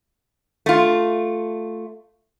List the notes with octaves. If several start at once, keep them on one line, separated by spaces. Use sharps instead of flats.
A3 F4